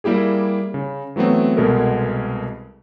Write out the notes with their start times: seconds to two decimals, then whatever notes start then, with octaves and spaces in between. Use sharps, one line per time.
0.04 G3 A#3 E4 G4 G#4
0.74 C#3
1.16 E3 F#3 A3 B3 C4
1.57 C2 B2 G#3 B3 A4 A#4